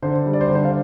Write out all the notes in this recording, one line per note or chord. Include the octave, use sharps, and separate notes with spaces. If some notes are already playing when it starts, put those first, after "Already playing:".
D3 C5
G3
D5
C5
D3
C5
F5